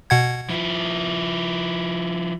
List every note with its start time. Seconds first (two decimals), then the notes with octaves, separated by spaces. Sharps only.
0.10 B2 F#5 G#6
0.50 F3 E4